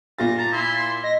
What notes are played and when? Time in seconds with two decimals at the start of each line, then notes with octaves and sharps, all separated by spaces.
0.19 A#2 F4 A6 A#6
0.38 A5 A#5
0.52 E4 C6
1.04 D#5 A#6